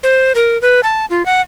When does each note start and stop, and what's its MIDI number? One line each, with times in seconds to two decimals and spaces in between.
0.03 0.32 72
0.35 0.60 70
0.62 0.81 71
0.83 1.05 81
1.10 1.25 65
1.26 1.41 78